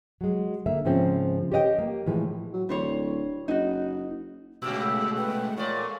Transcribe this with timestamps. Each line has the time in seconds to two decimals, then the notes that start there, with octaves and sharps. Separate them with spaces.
0.21 F#3 G#3
0.66 D3 A#3 E5
0.85 G#2 C#3 F3 C4 C#4
1.52 G4 B4 C#5 D#5 F5 G5
1.78 A#3
2.06 A2 E3 F3 G#3
2.53 F#3
2.69 D1 G3 C5 C#5
3.48 F#1 D#4 F#4
4.62 A#2 C#3 G#3 A3 G4 F#5 E6
5.16 B4 G5
5.58 A#2 A4 C#5 D5 F5 G#5 C#6